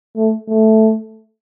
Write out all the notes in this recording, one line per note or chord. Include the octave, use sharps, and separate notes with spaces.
A3
A3